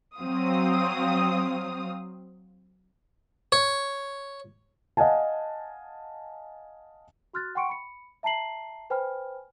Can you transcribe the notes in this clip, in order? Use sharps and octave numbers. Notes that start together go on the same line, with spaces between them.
F#3 C4 F5 D#6
C#5
D#5 F5 F#5 G#5 A5
F#4 C6 F6 F#6 A6
F#5 G5 C6 C#6 C#7 D7
B5 C#7
E5 A5 A#5 C7 F#7
B4 C5 G5 G#5 B5 F6